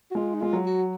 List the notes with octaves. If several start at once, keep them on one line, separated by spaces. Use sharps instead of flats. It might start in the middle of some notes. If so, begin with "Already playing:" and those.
F#4
G#3 F4
D#4
G#3 F4
F#3
F#4